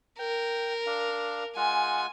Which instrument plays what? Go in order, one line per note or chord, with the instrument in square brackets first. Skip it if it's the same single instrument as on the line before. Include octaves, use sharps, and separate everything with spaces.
[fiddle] A#4 [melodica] G5
[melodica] D4 F5
[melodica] G#3 F4 F#5 [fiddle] G#5